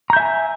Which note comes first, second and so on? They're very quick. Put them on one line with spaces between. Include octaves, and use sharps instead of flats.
A#5 G6 E5 G#5